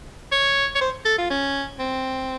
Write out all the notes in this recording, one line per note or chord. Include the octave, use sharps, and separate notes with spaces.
C#5
C#5
C5
A4
F4
C#4
C4